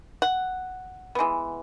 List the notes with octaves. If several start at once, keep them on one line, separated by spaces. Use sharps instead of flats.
F#5
E3 G#3 B3